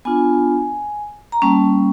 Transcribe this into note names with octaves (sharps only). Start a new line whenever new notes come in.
B3 D4 F4 G#5
A#5
G3 A#3 C#4 A5